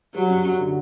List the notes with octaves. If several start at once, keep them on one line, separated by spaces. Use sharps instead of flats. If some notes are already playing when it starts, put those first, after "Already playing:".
F#3 G3
F#2
F#2
D3